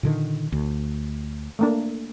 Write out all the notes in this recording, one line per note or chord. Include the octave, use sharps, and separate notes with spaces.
A#2 D3 D#3
D2
A3 A#3 D4